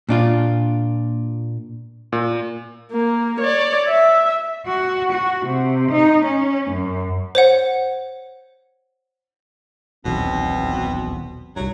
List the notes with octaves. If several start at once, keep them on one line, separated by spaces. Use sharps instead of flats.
A#2 D4 F4
A#2
A#3
C#5 D5
E5
F#4
F#4
C3
D#4
C#4
F#2
C5 C#5 F#5
D#1 B1 E2 B2 C4
C2 G2 F#3